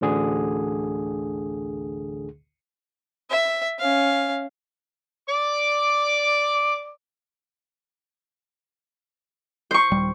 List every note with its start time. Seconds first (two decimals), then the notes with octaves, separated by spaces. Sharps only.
0.01 A1 D2 D3 G#4
3.30 E5
3.79 C#4 F5
5.29 D5 D6
9.71 C5 C#6
9.91 D#1 G3